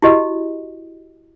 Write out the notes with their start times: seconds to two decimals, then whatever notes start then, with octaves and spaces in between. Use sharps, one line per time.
0.02 E4 F#4 G4 D#5